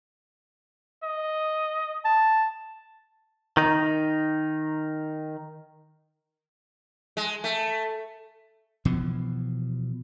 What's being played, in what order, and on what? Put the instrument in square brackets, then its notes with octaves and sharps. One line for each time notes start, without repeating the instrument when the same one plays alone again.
[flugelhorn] D#5
[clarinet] A5
[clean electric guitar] D#3 D#4
[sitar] G#3
A3
[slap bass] B2 E3 F3